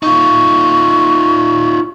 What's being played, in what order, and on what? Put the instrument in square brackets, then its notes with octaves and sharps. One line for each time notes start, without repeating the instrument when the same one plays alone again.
[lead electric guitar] D#4 F4 [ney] C#6